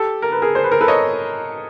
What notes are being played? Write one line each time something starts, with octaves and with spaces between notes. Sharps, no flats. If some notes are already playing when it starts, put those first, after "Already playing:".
Already playing: G4 A4
A#4
B4
G#4 A#4
C5
B4
A#4
A4 B4
C#5 D#5